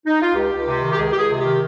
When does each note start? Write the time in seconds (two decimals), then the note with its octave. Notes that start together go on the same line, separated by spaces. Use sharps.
0.07 D#4
0.21 F4
0.35 C#2 G4
0.51 C#2
0.66 C3
0.81 D#3
0.92 G4
0.97 C#2 G#4
1.12 C#2 G4
1.19 G#4
1.29 C3 G#4
1.39 G4
1.44 D#3